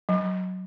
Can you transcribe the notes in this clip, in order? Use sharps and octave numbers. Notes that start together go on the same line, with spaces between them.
F#3